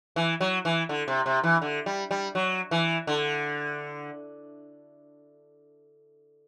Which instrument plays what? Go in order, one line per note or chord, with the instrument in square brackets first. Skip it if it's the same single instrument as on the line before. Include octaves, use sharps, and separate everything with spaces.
[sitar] E3
F#3
E3
D3
C3
C3
E3
D3
G3
G3
F#3
E3
D3